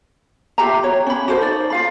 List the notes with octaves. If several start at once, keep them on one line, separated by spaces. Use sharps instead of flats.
F4 G4 E5 A#5
F#4 C#5
C#4 B5
F#4 A4 A#4 C5
D#4 D5
F4 F5 B5